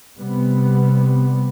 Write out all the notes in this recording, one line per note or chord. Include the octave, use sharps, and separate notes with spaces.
C3 G3 B3